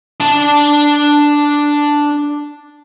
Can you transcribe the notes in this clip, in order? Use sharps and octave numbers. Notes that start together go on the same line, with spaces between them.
D4 A5